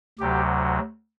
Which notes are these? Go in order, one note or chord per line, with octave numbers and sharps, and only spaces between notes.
D2 C3 F#3 G4